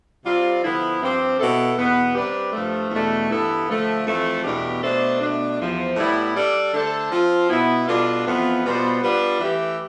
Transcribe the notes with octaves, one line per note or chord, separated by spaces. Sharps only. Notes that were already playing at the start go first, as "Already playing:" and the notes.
C3 G3 C4 F4
D3 F3 B3 E4
G2 F3 C4 G4 C5
B2 B3 E4 A4
E2 B2 B3
C3 G3 D4 G4 B4
G2 F3 A3
E2 B2 A3 D4
G2 E3 B3 E4 A4
D3 F3 A3
F2 E3 A3
E2 B2 A3 D4 G4
B2 A3 D4 A4 C5
B2 A3 D4
E2 C3 F3
A2 G3 B3 E4
G3 D4 A4 D5
D3 A3 D4 A4 C5
F3 C4 F4
B2 B3 E4
B2 G3 D4 F4 A4
F2 E3 B3 F4
B2 G3 B3 F4 C5
G3 B3 D4 F4 B4
E3 A3 E4 G4